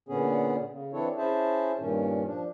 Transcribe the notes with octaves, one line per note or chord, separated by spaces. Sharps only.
A#2 D3 B3 C#4 G#4
C#3
E3 C4 D4 E4 A4 C#5
C#4 E4 G#4 C5 E5 A5
G2 A#2 D#3 C#4
F3 D4